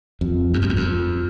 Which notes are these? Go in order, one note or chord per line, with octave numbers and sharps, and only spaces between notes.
F2
F#2
F2
E2
F2